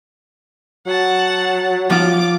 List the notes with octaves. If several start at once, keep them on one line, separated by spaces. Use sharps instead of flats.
F#3 F#5 A5
F3 F#3 F4 D6